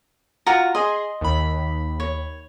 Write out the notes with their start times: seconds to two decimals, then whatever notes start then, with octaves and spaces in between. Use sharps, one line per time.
0.46 F4 F#4 A#5
0.75 G#4 D#5 C6
1.21 D#2 B5
2.00 C#5